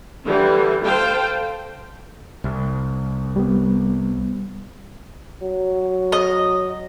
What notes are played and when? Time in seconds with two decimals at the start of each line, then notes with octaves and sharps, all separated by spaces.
0.25 D3 E3 G3
0.84 A4 C5 F5 G5 A5
2.44 C2
3.36 G3 B3
5.43 F#3
6.12 D#5